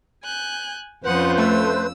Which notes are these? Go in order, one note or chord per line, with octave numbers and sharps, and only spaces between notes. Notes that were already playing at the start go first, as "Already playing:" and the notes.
G#5 F#6 G6
F2 F3 C#4 F4 B4 C5 F#5 D#6
A3 E6